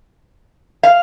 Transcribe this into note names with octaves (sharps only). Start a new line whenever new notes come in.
F5